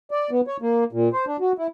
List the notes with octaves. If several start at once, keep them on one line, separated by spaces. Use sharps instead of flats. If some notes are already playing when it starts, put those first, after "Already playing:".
D5
B3
C#5
A#3
A#2
C5
D4
F#4
E4